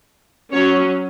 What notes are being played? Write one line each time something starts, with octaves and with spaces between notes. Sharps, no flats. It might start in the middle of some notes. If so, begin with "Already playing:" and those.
F#3 C#4 C#5